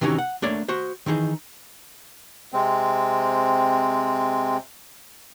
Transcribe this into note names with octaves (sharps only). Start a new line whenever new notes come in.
C3 D#3 E3 C#4 D#4 F#4
F#5
A3 A#3 D4 C#5 D5
F#4 C5
D#3 E3 D#4 G#4
C3 G#3 C4